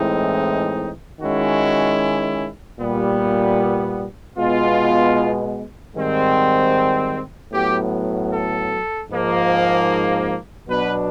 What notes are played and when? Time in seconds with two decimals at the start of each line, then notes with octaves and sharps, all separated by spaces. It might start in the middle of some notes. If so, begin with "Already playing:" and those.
Already playing: A2 E3 G#3 C4 D#4
1.20 D#3 G#3 C#4 E4 F#4
2.79 A#2 G3 B3
4.37 B2 G#3 B3 F4
5.95 G#2 D#3 G3 C4
7.52 A2 F#3 B3 G4
8.32 A4
9.10 G#2 F3 A#3
10.68 B2 F#3 B3 D4 B4